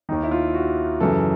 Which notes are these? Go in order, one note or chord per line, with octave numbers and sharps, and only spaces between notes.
D#2 D#3 D#4
E4
F4
F#4
F#2 C#3 E3 A4